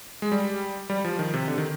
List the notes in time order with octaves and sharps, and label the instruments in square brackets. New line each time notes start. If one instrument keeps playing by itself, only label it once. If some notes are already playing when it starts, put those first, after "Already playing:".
[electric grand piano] G#3
G3
G3
F3
D#3
C3
D3
D#3